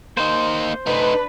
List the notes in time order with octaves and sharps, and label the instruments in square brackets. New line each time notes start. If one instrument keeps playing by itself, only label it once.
[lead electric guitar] A#3 D#4 [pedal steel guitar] C5
[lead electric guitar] A3 D#4 [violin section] D4 B4